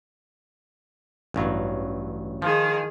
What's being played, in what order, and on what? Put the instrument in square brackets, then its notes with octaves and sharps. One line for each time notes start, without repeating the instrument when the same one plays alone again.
[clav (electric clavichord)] A1 G2 F#3
[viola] D#3 G#4 [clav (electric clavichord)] F3